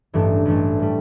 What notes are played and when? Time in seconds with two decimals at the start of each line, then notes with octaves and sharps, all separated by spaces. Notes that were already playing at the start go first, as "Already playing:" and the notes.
0.13 A1 G2 E3 A3 D4
0.45 A1 G2 E3 A3 D4
0.79 A2 G3